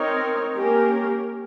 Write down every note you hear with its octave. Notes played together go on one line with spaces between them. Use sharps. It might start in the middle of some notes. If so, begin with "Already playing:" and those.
Already playing: C4 D#4 A#4 C#5
A#3 C#4 G4 A#4